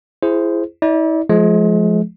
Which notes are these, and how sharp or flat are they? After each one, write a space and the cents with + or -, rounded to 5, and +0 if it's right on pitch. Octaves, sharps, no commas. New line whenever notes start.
E4 +25 G#4 +0 C5 +0
E4 -45 D5 -10
F3 +0 G#3 +35